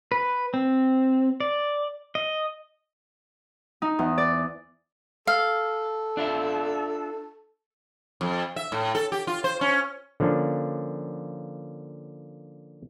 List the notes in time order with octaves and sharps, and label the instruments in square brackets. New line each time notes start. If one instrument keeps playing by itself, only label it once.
[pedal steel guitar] B4
C4
D5
D#5
[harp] D#4
E2
D5
[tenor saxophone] A4 [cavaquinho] F5
[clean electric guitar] D4 F4 E5
[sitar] F2
E5
A2
A4
G4
F4
C5
C#4
[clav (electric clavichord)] D3 F3 A#3 C#4 D4